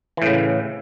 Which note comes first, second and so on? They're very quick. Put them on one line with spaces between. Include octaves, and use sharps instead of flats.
E3 A2 C#3